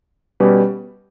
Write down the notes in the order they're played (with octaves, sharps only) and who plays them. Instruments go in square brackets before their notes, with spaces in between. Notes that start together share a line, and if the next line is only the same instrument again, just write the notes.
[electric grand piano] B2 G3 C#4 G4 B4